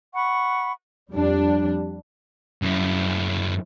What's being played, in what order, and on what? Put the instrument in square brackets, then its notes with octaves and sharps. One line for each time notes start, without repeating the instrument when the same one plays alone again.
[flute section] F#5 B5 C#6
[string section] F2 G3 D4
[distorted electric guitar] F#2 E4